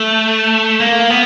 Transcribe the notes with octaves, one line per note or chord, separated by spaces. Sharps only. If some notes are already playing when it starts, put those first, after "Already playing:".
Already playing: A3
A#3
B3